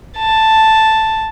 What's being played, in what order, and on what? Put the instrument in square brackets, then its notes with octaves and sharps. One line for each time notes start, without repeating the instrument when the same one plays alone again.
[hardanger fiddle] A5